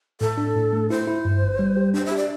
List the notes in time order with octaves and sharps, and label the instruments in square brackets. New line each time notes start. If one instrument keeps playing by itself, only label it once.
[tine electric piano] A2 [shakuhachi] A4
[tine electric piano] D4
A2
A3
[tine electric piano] E4 [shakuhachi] C5
[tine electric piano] E4
G2
G1
G3
G4
[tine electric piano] D4 [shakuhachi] C5
[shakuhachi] E5
[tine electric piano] G4
[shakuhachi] D5